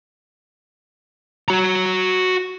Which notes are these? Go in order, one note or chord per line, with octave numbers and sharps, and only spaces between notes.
F#4 A#5